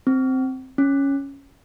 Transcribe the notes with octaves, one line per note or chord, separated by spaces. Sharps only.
C4
C#4